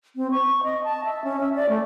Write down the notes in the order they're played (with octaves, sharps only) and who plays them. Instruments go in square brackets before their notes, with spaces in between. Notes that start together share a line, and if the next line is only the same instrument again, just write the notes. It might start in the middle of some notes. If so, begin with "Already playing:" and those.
[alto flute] C4
C#6
D#5
A5
E5
C#4
E5
D5
A3